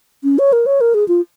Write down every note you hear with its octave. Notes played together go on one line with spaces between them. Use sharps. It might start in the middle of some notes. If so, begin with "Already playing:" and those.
C#4
C#5
A#4
C#5
A#4
G#4
F4